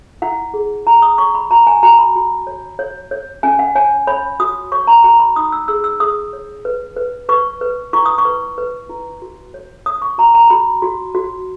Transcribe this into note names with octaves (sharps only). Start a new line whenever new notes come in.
E4 F#5
G#4
E4 A#5
D#6
C#5 C#6
B5
F#4 A#5
G#5
F#4 A#5
B5
F#4
C#5
C#5
C#5
C#4 G#5
F#5
C#5 G#5
C#5 B5
F#4 D#6
C#5 C#6
A#5
F#4 A#5
B5
D#4 D#6
E6
G#4 E6
E6
G#4 D#6
C#5
B4
B4
B4 C#6
B4
E4 C#6
D#6
C#6
B4
B4
E4
F#4
C#5
C#5 D#6
C#6
F#4 A#5
A#5
F#4 B5
F#4
F#4